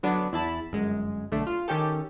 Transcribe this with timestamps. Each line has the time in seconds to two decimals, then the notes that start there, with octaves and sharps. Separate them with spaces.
0.03 D3 F#3 B3 D4
0.32 E2 E4 A5 B5
0.71 G1 F#2 G#3
1.31 B1 D3 A3 D4
1.47 F4
1.68 D#3 C#4 G4 A4